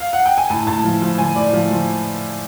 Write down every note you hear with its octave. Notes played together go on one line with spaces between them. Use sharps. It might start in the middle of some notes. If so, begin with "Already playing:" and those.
F5
F#5
G5
G#5
A2 A5
A2 A5
F3
F3
F3 G#5
A2 D5
F3
F3